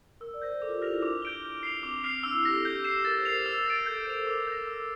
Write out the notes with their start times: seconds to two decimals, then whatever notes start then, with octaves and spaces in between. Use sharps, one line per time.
0.21 A#4 E6
0.34 D5
0.42 C5 G6 A#6
0.52 A#4
0.62 A4 D6
0.69 F4
0.75 G4
0.82 F6 A#6 F7
0.89 E4
1.02 D4 D6
1.22 G6 D7 G7
1.43 F6
1.63 C7 F7
1.83 C4 D6
2.04 F6 C7 F7
2.24 D4 E6
2.33 E4
2.44 G4 A#6 F7
2.54 A4
2.65 G4 G6
2.84 C7 E7
3.05 A#4 A6
3.18 C5
3.25 A#4 C7 F7
3.46 E6
3.66 A6 D7
3.86 A4 G6
3.96 A#4
4.06 C5 D7 F7
4.16 A4
4.27 A#4 D6
4.47 G6 A#6
4.67 E6